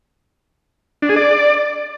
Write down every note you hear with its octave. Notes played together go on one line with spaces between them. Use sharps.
D4
G#4
D5